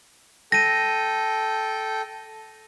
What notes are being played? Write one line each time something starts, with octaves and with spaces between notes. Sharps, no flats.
A4 G5 A#6 D#7